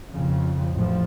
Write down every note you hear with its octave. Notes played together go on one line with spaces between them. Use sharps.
F2 C#3
A1 A2 F3